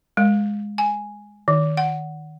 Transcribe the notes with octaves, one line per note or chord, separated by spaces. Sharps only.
G#3
G#5
D#3
F#5